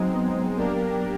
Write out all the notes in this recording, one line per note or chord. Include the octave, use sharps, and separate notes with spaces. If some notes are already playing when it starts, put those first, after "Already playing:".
Already playing: F#3 G#3 C4 D#4
B3
A#3 D4 G4 A#4